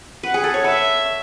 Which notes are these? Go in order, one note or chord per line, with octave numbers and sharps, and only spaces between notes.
B4 F#5
G#4
A4
C#5
B4 E5